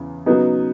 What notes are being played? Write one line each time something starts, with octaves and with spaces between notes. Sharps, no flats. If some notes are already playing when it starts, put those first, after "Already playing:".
Already playing: E2 C#3
C#3 F#3 B3 D#4